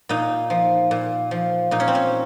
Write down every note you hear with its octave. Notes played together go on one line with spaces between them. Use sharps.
A#2 D#4
F3
A#2
F3
A#2 D#4
C#4
C4
C#4